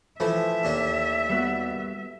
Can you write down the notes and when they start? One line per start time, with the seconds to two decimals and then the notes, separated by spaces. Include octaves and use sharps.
0.20 E3 F3 A3 E4 E5
0.64 D#2 A#3 D4
1.30 G3 B3 F#4